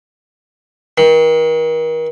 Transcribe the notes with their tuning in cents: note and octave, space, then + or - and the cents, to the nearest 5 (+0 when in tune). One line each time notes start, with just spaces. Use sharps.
D#3 +35